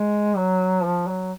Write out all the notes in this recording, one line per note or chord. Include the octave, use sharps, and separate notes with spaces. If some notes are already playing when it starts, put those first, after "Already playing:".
Already playing: G#3
F#3
F3
F#3